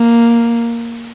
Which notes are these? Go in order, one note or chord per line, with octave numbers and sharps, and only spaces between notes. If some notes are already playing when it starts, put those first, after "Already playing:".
Already playing: A#3